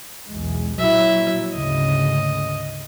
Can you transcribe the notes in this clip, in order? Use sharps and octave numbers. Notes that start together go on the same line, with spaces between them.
B1 E2 G#3
A#2 F#3 E4 E5
D2 G#2 C#3 D#5